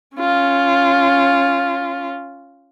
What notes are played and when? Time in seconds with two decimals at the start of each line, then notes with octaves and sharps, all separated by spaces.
0.17 C#4 F4